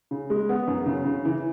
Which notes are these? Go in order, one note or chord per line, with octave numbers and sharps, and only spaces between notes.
C#3
G#3
B3
F#2
C#3
C#3
E3